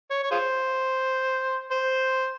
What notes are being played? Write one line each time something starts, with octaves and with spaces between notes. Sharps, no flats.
C#5
C#5
F4 G#4 C5
C5